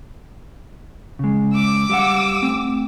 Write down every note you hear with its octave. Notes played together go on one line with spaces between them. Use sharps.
C#3 G#3
D6 E6
G3 F5 F#5
A3 C4